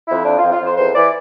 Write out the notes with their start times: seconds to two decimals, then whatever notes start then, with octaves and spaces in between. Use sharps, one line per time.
0.08 F2 E4
0.25 F3 D4
0.38 F4
0.43 F2
0.52 F4
0.61 F2 C5
0.77 E2 C5
0.94 E3 D5